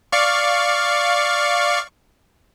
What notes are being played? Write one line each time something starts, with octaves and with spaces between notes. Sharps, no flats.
D5 F5 C#6